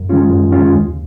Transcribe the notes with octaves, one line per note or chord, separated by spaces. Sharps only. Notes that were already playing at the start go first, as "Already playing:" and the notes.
Already playing: F#2
D#3 G#3 C#4 F4
F#2
D#3 G#3 C#4 F4
D#2